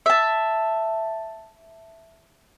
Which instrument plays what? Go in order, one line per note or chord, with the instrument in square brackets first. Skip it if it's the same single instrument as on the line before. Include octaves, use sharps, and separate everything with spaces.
[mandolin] E5 A5